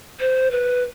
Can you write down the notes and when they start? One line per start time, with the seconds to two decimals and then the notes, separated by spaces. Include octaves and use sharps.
0.20 C5
0.51 B4